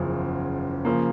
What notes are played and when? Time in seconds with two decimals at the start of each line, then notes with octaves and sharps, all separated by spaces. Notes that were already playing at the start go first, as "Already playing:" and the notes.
Already playing: F#1 E2 C#3 F3
0.85 C#3 F3 A#3